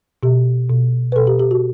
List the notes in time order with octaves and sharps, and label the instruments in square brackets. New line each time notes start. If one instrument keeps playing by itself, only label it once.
[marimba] B2 G4
B2
B4
B2 A4
G4
G4
F#4